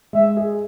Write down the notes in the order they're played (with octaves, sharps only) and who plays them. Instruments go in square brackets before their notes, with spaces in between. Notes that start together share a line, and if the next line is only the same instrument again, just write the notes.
[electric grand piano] G#3 [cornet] E5
[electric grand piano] G#4